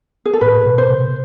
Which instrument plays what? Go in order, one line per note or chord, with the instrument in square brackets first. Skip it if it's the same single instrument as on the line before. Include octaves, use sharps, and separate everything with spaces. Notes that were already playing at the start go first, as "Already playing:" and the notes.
[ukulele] G#4
A4
[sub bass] A2 [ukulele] B4
[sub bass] B2
[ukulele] C5
[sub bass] C3